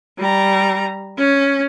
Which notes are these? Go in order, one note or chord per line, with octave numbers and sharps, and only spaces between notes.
G3 A#5
C#4